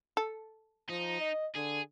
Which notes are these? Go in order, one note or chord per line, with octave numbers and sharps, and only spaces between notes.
A4
F3 D#4
D#5
D3 G#4